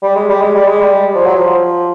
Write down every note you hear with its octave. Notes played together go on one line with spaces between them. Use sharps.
G3
G#3
G3
G#3
G3
G#3
G3
F3
F#3
F3